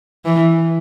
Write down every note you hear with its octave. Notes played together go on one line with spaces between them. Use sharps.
E3